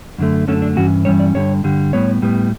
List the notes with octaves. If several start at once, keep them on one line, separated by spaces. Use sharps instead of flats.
F#2 D3 A3
F#2 D3 A3 C#4
D4
G2 E3 C#4 F#4
G2 E3 G3 C#4 C#5
D5
G2 D3 G3 C#5
G2 D3 G3
A2 G3 B3 C#5
A2 G3 B3